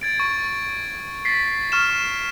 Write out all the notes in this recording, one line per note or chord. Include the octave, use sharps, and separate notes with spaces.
G#6 A6 D7
C#6
A6 B6 C7
C#6 F6 E7